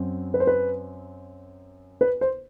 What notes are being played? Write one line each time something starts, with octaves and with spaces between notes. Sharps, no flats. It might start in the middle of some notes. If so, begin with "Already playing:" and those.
Already playing: F#2 F#3 C4
B4
C5
B4
B4
C5